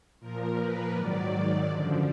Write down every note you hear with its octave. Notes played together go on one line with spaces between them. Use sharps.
A#2 F3 A#4
B4
G#2 D#3 F#3 D5
F#2 D3 F3